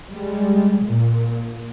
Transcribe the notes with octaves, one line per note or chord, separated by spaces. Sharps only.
G3 G#3
A#2